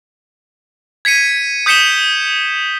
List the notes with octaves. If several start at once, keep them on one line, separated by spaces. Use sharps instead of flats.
G#6 B6 C#7 D#7
D#6 G6 B6 C#7 E7 G7